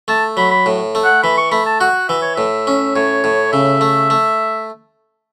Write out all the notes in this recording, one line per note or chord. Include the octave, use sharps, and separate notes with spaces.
A3 A5
F#3 B5
B5
A2
A3
F#5
E3 B5
C#6
A3 B5
A5
F#4 F#5
E3 E5
C#5
A2 E5
C#4
A2 C#5
A2
C#3 E5
A3
A3